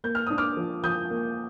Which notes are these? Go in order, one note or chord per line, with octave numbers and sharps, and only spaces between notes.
A#3 G6
F6
D4 D#6
D6 F6
F3
F3 D#6 G6
A#3